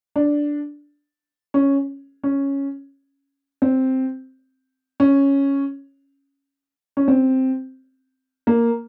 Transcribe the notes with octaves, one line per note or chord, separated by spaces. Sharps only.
D4
C#4
C#4
C4
C#4
C#4
C4
A#3